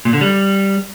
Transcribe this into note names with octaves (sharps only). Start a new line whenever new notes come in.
A#2
D3
G3